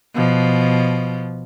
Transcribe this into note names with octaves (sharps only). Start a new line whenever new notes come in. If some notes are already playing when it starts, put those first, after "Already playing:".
B2 F3